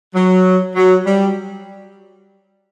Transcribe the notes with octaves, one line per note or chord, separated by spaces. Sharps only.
F#3
F#3
G3